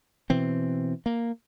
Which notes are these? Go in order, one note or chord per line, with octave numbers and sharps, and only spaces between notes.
B2 E3 C4
A#3